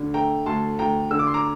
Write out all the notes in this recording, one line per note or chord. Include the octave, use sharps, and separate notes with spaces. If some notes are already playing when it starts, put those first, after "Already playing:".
Already playing: D2 D3
A3 G5 A#5
D2 A5 C6
D2 G5 A#5
D3 E6
D6
C6
A#5 D6